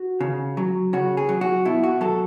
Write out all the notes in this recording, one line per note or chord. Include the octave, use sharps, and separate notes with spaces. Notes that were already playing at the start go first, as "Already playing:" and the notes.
Already playing: F#4
C#3
F#3
C#3 F#4
G#4
F#3
F#4
B2 E4
F#4
F#3 A4